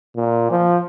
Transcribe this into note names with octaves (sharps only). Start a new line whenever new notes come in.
A#2
F3